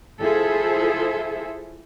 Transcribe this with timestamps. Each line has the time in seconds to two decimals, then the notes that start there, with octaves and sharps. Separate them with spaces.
0.21 E4 F4 G#4 A4 C5 E5